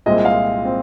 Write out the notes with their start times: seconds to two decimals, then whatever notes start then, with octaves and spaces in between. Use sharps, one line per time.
0.06 C2 A#2 G#3 C4 D#5
0.25 F5
0.65 C4